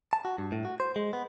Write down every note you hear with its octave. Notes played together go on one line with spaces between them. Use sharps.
A5
F#4
G2
A2
F#4
C5
G#3
B3